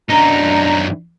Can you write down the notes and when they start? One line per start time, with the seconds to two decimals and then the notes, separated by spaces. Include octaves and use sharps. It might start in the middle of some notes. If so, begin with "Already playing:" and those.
0.10 F#2 D4 D#4 A#5